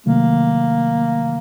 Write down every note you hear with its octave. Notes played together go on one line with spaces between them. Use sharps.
C3 D#3 F#3 A3 A#3